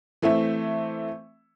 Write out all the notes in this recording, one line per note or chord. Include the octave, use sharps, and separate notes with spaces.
E3 A3 C4 E5